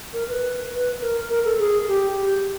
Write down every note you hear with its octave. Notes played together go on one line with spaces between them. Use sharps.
A#4
B4
B4
A#4
A#4
A4
G#4
G4